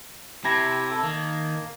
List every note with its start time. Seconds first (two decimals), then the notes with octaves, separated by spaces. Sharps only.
0.44 C3 E4 G4 A5 G#6 A#6
0.91 A4
1.03 D#3 A#3